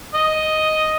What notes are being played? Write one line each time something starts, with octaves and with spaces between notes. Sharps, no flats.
D#5